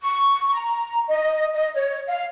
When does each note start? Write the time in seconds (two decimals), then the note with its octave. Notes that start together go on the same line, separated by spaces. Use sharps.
0.02 C#6
0.53 A#5
1.08 D#5
1.53 D#5
1.74 C#5
2.07 F5